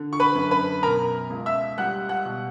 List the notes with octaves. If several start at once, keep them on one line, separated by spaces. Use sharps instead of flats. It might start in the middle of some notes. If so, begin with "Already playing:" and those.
Already playing: D3
C#6
B4 B5
F#2
B4 B5
B2 A#4 A#5
C#2
E5 E6
G3 F#5 F#6
F#5 F#6
B2